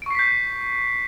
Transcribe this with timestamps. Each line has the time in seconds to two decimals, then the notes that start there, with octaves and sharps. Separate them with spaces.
0.02 D7
0.06 C#6
0.11 C7
0.15 B6
0.19 G6